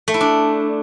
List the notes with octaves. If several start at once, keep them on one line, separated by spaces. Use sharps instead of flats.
A3
E4
D4